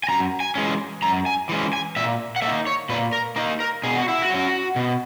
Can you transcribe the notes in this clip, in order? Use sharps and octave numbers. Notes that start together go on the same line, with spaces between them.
G#5
F#2 A#5
G#5
E3 G#3 C#4
F#2 A#5
G#5
E3 G#3 C#4
G#5
A#2 E5
F#5
A#3 E5
D#4
C#5
A#2 B4
A#4
A#3 D#4 A#4
A#4
B2 G#4
F#4
E4
F#4
F#3 C#4
B2